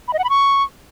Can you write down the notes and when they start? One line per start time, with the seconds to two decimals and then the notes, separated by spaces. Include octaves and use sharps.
0.08 B5
0.13 D#5
0.19 F#5
0.24 B5
0.30 C#6